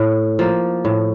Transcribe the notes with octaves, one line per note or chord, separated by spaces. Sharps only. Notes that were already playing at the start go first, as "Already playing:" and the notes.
Already playing: A2
F3 A#3
A2